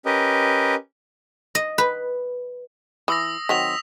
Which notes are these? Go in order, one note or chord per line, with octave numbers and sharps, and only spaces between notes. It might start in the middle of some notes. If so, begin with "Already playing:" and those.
C#4 G4 A#4 B4 D#5
D#5
B4
E3 D#6 E6 A#6
D#3 F#3 C4 B6 F7